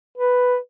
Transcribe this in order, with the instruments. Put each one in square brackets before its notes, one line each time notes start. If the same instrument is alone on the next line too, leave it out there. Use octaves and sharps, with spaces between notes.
[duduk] B4